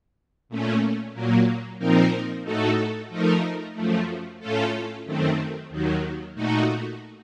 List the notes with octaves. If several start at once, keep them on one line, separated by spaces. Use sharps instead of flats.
A#2 A3 C#4
A#2 F#3 A#3
A#2 F3 C4 D#4 A#4
A2 A3 D#4 F#4 A4
F3 A3 D#4 A#4
F#2 F3 A3
A2 A3 C#4 F4 A4
F#2 D#3 A3 C4
D#2 D#3 F#3
A#2 A3 D#4 F#4